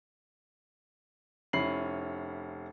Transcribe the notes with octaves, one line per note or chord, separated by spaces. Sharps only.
F1 C#4 E4 B5 C7 F#7